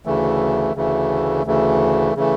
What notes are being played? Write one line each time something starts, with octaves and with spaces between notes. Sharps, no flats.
D2 C#3 E3 A3
D2 C#3 E3 A3
D2 C#3 E3 A3
C#3 E3 A3